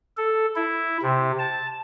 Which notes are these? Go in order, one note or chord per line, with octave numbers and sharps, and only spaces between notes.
A4
E4
C3
A5